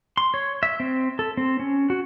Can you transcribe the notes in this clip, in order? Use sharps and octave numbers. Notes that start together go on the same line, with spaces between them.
C6
C#5
E5
C4
A4
C4
C#4
F#4